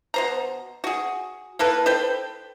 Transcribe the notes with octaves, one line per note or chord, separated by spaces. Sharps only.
B2 C5 A#5
F#4 G#4
A#3 E4 A4 B4
A4 B4 C5 G5